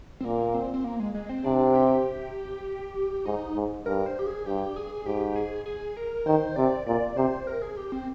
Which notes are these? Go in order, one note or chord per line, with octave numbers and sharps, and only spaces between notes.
C4
A#2 A#3
C4
C4
A#3
G#3
G#3
C4
C3 D4
G4
G#2 D#4
G#2
G2 A#4
C5
G4
G#4
G2 G4
G#4
G#2 G4
G#4
G#4
A#4
D#3 C5
C3 D5
A#2 D5
C3 C5
A#4
G#4
G4
C4